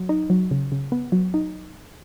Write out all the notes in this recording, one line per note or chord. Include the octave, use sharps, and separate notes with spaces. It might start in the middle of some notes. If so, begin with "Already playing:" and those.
Already playing: F#3
D#4
F#3
C#3
C#3
B3
F#3
D#4